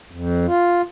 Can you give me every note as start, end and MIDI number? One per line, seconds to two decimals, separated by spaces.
0.11 0.46 41
0.47 0.82 65